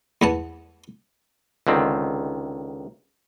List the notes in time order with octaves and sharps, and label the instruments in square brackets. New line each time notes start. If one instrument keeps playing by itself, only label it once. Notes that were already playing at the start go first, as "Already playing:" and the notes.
[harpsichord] E2 B3 A5
[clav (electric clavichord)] C#2 D3 D#3 C4